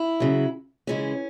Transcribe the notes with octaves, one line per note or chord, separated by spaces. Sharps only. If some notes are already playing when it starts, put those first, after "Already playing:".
Already playing: E4
C#3 F#3
C#3 E3 G#3 C#4